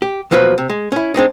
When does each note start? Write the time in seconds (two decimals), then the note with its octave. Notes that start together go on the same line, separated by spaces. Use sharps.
0.02 G4
0.31 D#2 B2 F3 F#3 G4 B4
0.58 C3
0.70 G#3
0.92 C#4 E4
1.14 G#3 C4 D4 D#4